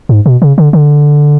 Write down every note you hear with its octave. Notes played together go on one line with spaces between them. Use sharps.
G#2
B2
C#3
D3
D3